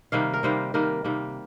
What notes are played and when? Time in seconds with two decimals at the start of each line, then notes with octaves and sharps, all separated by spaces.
0.12 C3 D#3 G3 A#3 F5
0.33 A#4
0.43 C3 D#3 G3 A#3 C5
0.74 C3 D#3 G3 A#3 A#4
1.04 C3 D#3 G3 A#3